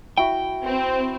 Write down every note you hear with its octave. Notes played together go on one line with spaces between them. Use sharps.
E4 F#4 G5
C4